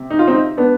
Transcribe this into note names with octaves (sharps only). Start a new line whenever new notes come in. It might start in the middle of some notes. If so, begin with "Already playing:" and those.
Already playing: C3
D#4
F4
C4 D#4
B3 D4